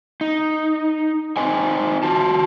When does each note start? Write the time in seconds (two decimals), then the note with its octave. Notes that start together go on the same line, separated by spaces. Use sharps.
0.21 D#4
1.37 C4 D#4 B4 C5 D#5 G#5
2.03 F4 F#4 A5